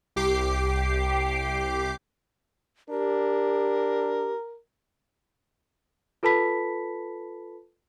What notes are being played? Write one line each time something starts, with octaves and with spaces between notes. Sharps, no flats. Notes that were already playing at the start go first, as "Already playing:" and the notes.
C2 G4 D6 C7
D4 G4 A#4
F4 A4 B4 A5 B5 B6